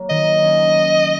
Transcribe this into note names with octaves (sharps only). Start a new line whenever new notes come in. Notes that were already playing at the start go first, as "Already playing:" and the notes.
Already playing: F#3 A#3
D#3 D#5
A#3 C#4